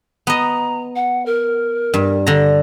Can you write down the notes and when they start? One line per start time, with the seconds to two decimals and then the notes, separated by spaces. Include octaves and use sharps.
0.27 B3 D#5 A#5
0.96 F#5
1.26 A#4
1.94 G2
2.27 D3 A#5